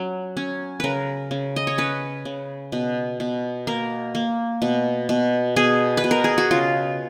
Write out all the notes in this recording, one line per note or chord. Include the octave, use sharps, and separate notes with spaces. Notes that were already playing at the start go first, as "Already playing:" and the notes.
Already playing: F#3 C#4
C#4
C#3 A#4 B4
C#3
D#5
C#5
C#4 B4
C#3
B2
B2
A#3 A#4
A#3
B2
B2
B2 G#4
B4
B2
A#4
G#4
F#4
C#3 F4